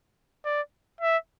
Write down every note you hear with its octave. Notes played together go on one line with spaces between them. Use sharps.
D5
E5